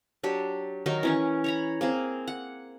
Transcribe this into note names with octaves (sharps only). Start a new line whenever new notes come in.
F#3 D4 G4
D#3 F#3 D#4 A#4
E3 C#4 C#6
C#5 A#5 B5
A#3 C4 G#4
F#5